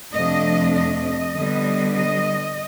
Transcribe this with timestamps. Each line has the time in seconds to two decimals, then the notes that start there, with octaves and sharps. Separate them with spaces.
0.14 F2 C3 F3 A3 D4 D#5
0.74 D#5
1.35 D3 G3 B3
1.96 D#5